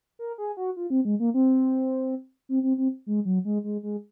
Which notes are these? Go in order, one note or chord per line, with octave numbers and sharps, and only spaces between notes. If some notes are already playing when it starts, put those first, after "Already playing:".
A#4
G#4
F#4
F4
C4
G#3
A#3
C4
C4
C4
C4
G#3
F#3
G#3
G#3
G#3